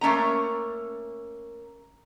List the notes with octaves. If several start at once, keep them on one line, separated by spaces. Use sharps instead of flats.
A3 A#3 C#4 A#5